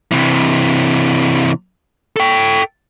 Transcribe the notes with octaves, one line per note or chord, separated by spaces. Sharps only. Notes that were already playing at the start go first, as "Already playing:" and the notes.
C3 E3
A4 G5